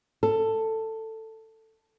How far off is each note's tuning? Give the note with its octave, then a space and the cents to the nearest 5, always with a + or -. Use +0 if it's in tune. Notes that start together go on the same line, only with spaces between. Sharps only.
A4 +10